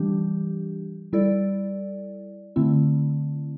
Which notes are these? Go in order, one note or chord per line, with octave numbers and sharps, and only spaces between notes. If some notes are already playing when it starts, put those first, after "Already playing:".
Already playing: E3 G3 D4 G4
G3 E4 A4 D5
D3 A3 C4 E4